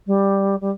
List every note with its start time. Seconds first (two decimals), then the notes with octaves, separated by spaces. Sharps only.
0.07 G3
0.61 G3